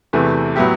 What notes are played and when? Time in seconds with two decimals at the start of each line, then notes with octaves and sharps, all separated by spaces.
0.13 E2 C3 E3 A3
0.56 A2 F#3 B3 E4 G4